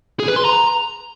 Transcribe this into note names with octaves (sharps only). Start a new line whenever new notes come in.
G#4
B4
C6
A#5